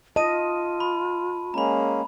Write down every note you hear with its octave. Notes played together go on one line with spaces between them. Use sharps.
F4 D#5 A5 D#7
B5
G#3 A#3 C#4 A#5 B5